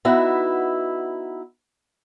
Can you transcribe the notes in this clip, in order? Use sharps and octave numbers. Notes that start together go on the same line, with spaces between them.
B3 D#4 E4 F#4 E5